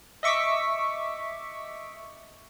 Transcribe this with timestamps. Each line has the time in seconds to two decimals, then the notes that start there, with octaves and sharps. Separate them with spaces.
0.23 D#5 E5 C#6 D6 B6